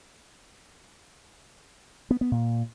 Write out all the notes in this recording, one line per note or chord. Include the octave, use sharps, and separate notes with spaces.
B3
B3
A#2